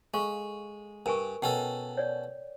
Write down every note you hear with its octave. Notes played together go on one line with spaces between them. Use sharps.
G#3 A4 F5 C#6
G2 A#4 G#5 C#6
B2 C#4 A4 G5
C#5 D5